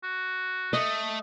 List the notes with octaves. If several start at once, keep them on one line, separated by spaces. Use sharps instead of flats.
F#4
A3 D#5